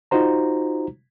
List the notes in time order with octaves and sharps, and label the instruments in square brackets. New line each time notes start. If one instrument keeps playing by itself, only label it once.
[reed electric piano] D#4 F4 F#4 C5 A#5